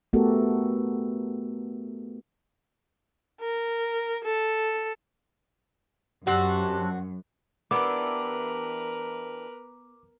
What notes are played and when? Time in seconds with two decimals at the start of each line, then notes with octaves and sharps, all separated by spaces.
0.13 A3 B3 F#4 G4 A4 A#4
3.41 A#4
4.24 A4
6.27 F#2 C4 D4 F#4 G4
7.71 E3 B3 D4 G4 A#4 B4 D6